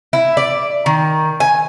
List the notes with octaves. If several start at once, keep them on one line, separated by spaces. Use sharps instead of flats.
E4
D5
D#3
G#5